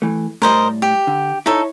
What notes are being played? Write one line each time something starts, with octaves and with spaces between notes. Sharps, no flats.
E3 A3
A2 G3 A#4 C5 D#5
G4
D3
D#4 E4 A4 C#5